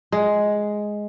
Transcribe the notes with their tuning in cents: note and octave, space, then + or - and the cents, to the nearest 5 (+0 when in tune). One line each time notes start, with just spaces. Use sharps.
G#3 +5